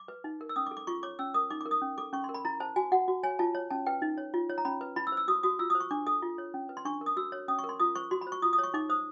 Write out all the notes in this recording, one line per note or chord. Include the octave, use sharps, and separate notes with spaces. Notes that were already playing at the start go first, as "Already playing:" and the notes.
Already playing: D6
B4
D#4
A#4
E6
C#4 D#6
D6
A4
D6
F4 C#6
C#5 D6
C#4 E6
A#4 D#6
D#4 D6
A#4 D6
D#6
C#4
A4 D6
C#4 C#6
C6
A#4
B5
E4 A#5
C5 A5
F#4 G#5
F#4 F#5
F#4
C#5 G#5
F4 A5
C#5
C#4 A5
B4 G5
D#4
C#5
F4
C#5
A#5
C#4 B5
B4
E4 B5
E6
C5
E6
F#4 D#6
F#4 D#6
F4 E6
C5 D#6
C#6
D4 D6
A4 D#6
F4
C#5
C#4
B4
C6
D4 C#6
A#4
D#6
F#4 E6
C#5
C#4 D#6
C#6
A#4
C6
F4 D#6
C5 C#6
F#4 C6
B5
C5
C#6
F4 D#6
D#6
C#5
C#6
D#4 D6
C5 D#6